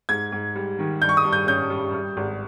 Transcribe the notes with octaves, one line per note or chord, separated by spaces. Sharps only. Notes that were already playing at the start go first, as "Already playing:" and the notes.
G#2 G#6
G#2
G3
D#3
G2 G6
C#6
D#6
G2
G6
C#4 G6
G3
G3
G#1